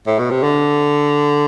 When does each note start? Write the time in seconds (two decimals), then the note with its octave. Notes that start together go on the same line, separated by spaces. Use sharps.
0.07 A2
0.19 B2
0.31 C3
0.43 D3